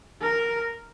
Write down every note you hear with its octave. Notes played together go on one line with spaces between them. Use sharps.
A#4